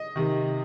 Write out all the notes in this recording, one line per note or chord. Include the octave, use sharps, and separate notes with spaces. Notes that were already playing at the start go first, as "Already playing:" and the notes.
Already playing: D#5
C3 D#3